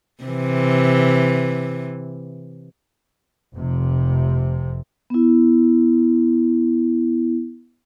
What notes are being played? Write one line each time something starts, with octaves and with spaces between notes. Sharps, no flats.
C3 E3
F1 C3
B3 E4